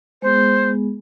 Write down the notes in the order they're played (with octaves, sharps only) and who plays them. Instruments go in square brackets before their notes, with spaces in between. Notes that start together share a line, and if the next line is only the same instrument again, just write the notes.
[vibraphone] G#3 B3 G#4 [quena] C5